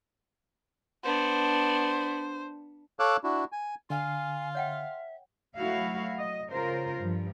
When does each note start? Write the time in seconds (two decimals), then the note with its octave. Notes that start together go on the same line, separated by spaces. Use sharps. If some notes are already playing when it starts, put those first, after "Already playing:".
1.04 B3 D4 C5
2.99 A4 C#5 F5 D6 E6 F#6
3.24 D4 E4 F#4
3.52 G#5
3.90 D3 F4 F5 G#5
4.55 C#5 E5 F#5 G5
5.56 F#3 A3 E4 F#4 F5
6.18 D#5
6.51 C#3 F4 A#4 C5
7.01 G2 F3